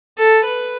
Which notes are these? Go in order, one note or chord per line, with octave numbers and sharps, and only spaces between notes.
A4
B4